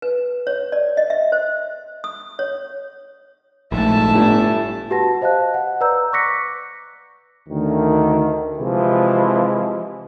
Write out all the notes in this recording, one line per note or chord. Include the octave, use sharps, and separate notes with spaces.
B4
C#5
D5
D#5
E5
C5
D#6
C#5
A#1 G#2 A3 E5 A5
G1 A2
F#4 G4 B4 F#5 A5 A#6
C5 D#5 F5 A5 F#6
F#5
B4 D5 A#5 E6 G6
C#6 D6 F#6 A#6 B6 C#7
D2 D#3
C3 E3 F3 G#3